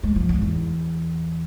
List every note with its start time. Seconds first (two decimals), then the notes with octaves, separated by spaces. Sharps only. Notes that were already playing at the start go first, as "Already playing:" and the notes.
0.03 G#3
0.16 F3
0.29 G#2
0.42 E2